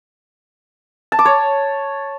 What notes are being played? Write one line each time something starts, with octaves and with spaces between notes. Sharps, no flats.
A5
D6
C#5